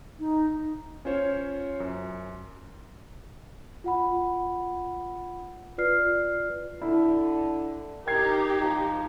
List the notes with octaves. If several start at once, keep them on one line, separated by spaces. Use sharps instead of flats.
D#4
C#4 F4 C5 C#5
F#2
F4 F#5 B5
F4 B4 D5 F6 C7
D3 E4
D#4 G4 A#4 G5 G#6 C7
F3 A#5